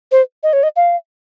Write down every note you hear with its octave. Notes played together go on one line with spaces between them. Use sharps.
C5
D#5
C#5
D#5
F5